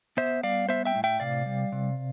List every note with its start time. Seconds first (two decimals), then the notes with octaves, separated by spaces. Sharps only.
0.17 B3 C5 E5
0.43 G3 D5 F5
0.69 B3 C5 E5
0.85 E5 G5
0.95 A2
1.04 E5 G5
1.20 C3 D5 F5
1.46 G3
1.72 C3